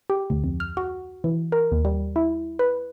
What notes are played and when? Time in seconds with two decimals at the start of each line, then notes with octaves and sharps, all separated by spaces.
0.10 G4
0.30 D2
0.44 F2
0.60 F6
0.77 F#4
1.24 E3
1.52 A#4
1.72 D#2
1.85 G3
2.16 E4
2.59 B4